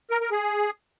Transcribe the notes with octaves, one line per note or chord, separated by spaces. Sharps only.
A#4
A#4
G#4